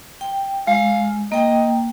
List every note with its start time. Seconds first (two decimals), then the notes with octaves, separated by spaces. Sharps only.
0.21 G5
0.67 G#3 F5
1.32 A#3 D#5 G5